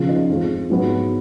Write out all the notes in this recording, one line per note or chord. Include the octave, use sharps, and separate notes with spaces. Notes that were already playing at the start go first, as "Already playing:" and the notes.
Already playing: C#3 F3 B3 F4
D#4
F2 F3 G#3 F4
G#2 F#3 B3